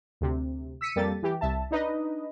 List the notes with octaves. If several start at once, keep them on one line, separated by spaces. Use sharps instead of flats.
D2 C3
E6 B6 C#7 D#7
F2 G3 A#3 G4 A4 A6
E3 G4
C2 E5 A5
D4 D#4 B4 D#5